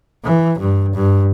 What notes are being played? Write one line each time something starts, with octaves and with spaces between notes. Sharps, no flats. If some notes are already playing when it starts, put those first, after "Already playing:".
E3
G2
G2